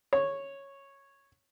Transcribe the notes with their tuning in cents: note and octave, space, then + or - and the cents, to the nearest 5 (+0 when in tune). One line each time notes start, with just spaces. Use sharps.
C#5 -5